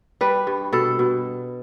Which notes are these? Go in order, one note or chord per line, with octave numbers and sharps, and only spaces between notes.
G3 B4
G2
B2 A4
B2